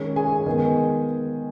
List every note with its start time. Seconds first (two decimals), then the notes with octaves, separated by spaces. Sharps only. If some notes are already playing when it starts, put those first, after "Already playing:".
Already playing: D#3 G#3 C#4
0.16 G#4 G#5
0.46 D#3 G#3 B3